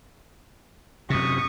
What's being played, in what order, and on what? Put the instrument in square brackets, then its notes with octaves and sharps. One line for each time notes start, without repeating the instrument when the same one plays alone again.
[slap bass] F#2 C3 [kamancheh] C#6 D#6